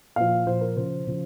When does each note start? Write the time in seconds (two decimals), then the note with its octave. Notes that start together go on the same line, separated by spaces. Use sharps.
0.16 A#2 F3 F5
0.46 A#2 F3 C5
0.61 A#4
0.76 C#3 F3 C5
1.07 C#3 F3